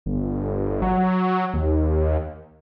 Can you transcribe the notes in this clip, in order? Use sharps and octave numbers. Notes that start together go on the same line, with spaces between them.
G1
F#3
D#2